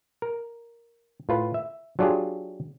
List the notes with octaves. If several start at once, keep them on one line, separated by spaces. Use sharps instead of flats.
A#4
A2 F4 B4
E5
F#3 D4 F4 G4 G#4